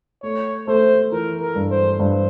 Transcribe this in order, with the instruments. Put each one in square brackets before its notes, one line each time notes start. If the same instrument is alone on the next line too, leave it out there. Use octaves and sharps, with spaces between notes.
[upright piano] A3 [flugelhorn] C#5
[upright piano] A3 [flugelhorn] C5
[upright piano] E3 [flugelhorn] A#4
[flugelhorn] A#4
[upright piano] G2
[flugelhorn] C5
[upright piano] G2 [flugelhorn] C5